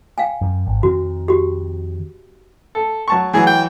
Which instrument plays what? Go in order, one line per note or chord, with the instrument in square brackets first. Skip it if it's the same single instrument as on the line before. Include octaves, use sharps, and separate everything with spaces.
[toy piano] F5 G5 G#5
[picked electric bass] F#2
G#1
[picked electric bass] F2 D#3 C4 [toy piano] F#4
[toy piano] F#4 G4
[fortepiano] A4
F#3 A5 C#6
[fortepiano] E3 F#3 [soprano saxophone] G#4
[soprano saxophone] G5